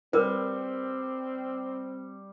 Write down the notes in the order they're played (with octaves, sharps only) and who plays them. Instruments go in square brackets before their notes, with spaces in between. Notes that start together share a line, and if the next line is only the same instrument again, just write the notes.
[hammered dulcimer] G3 [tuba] C4 [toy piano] A#4 B4